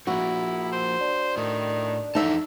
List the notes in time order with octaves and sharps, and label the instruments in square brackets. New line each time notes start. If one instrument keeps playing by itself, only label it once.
[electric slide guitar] F3 A#3 [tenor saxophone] E4 [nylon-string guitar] F#4
[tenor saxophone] C5
[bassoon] D4
[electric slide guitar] A2 [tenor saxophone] D#3
[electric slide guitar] F2 E3 A5 [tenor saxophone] D3 [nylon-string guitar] D#4 E5